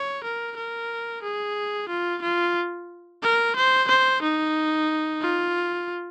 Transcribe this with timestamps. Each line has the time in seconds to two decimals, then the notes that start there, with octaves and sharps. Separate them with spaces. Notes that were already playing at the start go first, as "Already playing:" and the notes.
Already playing: C#5
0.24 A#4
0.57 A#4
1.23 G#4
1.89 F4
2.22 F4
3.22 A#4
3.56 C5
3.88 C5
4.22 D#4
5.21 F4